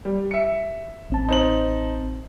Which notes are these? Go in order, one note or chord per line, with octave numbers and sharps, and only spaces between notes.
G3
E5 C#7
A1 C4 A5
D#4 C5 F#7